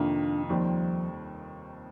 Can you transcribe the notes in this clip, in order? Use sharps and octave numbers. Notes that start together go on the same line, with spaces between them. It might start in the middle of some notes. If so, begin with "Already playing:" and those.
Already playing: F2 C3 D#3 A#3 D4 F4
D#2 D#3 F3 G3 C4